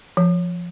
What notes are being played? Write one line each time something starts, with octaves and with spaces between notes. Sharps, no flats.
F3